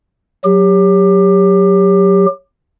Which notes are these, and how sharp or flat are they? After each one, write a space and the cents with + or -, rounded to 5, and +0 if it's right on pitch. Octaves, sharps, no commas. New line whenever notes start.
F#3 +0 G4 +25